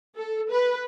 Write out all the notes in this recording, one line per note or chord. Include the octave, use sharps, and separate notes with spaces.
A4
B4